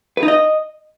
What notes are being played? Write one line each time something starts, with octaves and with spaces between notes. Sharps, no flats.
B4
D#4
D#5